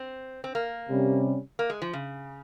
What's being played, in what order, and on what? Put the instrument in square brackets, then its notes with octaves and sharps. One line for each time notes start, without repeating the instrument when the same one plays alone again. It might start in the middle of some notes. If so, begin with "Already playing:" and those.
Already playing: [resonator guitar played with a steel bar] C4
C4
A#3
[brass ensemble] C3 G3 C#4
[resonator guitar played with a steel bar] A#3
G#3
F3
C#3